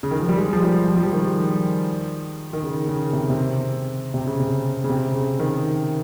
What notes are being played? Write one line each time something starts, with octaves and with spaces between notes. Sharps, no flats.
C#3
D#3
F3
G3
G#3
F3
G3
F3
G3
F3
D#3
D#3
C#3
C#3
C3
C3
C3
C#3
C3
C#3
C3
C#3
D#3